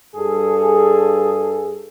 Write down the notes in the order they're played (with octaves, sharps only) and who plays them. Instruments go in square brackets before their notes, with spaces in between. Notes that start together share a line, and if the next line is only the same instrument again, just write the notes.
[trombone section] G2 G#4 A4